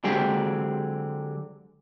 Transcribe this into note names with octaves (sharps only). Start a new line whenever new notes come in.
D3 F#3 G#3 C4 G4 G#4